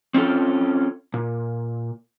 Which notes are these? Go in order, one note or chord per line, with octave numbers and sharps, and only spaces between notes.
C4 C#4 F4 A4
A#2